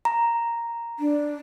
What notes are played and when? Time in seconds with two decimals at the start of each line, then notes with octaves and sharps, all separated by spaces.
0.05 A#5
0.99 D4